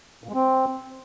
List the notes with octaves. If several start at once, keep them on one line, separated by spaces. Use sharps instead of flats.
A#2
G#3
C4